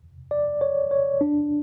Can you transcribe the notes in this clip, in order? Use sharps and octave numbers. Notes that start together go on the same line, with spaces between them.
D5
C#5
C#5
D4